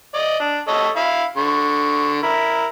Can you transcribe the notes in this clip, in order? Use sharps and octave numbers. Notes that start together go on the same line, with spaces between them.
D5 D#5
D4
A4 C#5 D#5
E4 F5
D3 C#6
E4 A#4